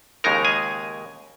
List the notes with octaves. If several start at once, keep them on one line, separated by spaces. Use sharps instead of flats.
D#2 C#3 G#3 D#4 A#4 A#5
G#4 G#5